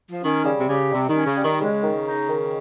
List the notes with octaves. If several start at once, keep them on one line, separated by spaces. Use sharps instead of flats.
F3
D#3 C#4
C#3 G3
C3
C#3 G4
C3 G3
D#3
C#4
C#3
G3
D#3
C#3 G#3
D#3
D#4
D#3